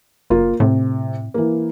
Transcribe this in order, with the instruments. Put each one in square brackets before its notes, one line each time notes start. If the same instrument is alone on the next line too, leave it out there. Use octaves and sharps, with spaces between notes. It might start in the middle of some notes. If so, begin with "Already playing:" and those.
[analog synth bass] F#1 [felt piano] A#3 F4
[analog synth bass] A2 [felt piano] C3
[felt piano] E3 A#3